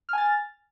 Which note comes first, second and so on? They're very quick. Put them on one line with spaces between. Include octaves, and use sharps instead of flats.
F6 G#5 A6